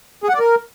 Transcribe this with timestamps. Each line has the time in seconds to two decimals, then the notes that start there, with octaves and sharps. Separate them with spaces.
0.24 G#4
0.29 F#5
0.34 D5
0.39 A#4